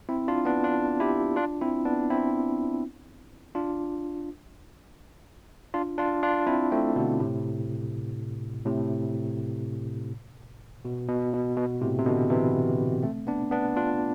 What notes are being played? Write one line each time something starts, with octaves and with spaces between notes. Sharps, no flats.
C4 E4
D4 F4
B3 D4
D4 F4
E4 G4
D4 F4
C4 E4
B3 D4
C4 E4
D4 F4
D4 F4
D4 F4
D4 F4
C4 E4
A3 C4
B2 D3
A2 C3
A2 C3
B2
B2
B2
B2
A2 C3
C3
B2 D3
C3 E3
A3 C4
B3 D4
B3 D4
D4 F4